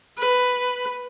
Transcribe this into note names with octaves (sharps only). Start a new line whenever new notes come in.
B4